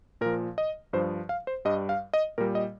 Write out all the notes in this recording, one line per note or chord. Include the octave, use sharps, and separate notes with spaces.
A#2 F3 A#4
D#5
G2 F3 C5
F5
C5
G2 G3 D#5
F5
D#5
A#2 G3 A#4
D#5